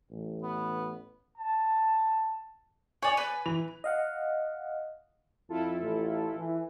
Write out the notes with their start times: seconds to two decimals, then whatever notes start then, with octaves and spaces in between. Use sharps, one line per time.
0.11 A1
0.42 B3
1.38 A5
3.03 C#5 D5 G#5
3.17 B4
3.46 E3 F7
3.84 D#5 F5 F#5
5.49 F2 E4 F4 A4
5.81 A1
6.36 E3